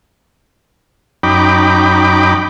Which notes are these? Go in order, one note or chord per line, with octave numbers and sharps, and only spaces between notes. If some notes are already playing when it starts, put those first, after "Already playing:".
F#2 D#4 G5 B5 D6